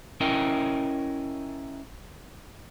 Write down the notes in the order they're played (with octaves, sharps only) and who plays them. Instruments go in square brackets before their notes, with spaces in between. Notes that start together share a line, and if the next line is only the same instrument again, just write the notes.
[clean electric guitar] C#4 E4 A#4 D#5 G5